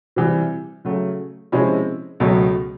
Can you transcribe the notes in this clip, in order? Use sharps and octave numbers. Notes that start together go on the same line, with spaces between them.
C3 E3 G3
C#3 F#3 A3
C3 F3 G#3 C#4 E4
C#2 B2 F#3 A3